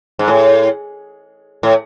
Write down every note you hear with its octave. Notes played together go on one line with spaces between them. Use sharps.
G#2
A2
A2